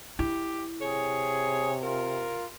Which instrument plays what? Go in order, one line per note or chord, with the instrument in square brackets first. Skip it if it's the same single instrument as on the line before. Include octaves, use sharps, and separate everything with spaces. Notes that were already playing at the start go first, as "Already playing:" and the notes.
[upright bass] E4 [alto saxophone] G4
[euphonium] C3 [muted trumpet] G#4 [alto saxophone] C#5
[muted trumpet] F4 [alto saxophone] A#4